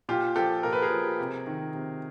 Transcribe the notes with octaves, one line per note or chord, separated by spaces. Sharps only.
A#2 F4 G4
F3 G4 A4
A#2 A#4
B4
G#4 A#4
F3
C3
D#3
C3